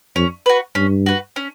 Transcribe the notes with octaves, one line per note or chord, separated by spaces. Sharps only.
F2 C#4
F#4 B4
G2 C#4
F#4 B4
C#4